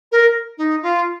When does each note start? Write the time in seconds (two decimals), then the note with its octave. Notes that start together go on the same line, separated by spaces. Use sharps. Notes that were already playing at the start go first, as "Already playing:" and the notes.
0.12 A#4
0.58 D#4
0.82 F4